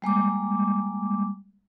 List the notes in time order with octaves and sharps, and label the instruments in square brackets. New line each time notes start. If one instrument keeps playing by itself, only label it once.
[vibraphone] G3 G#3 A#3 D6